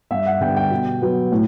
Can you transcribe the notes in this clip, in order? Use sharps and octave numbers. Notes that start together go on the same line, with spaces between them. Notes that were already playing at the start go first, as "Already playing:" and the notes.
G2 E5
F#5
D3 G3 B3 G5
G5
B2
F#3 B3
A2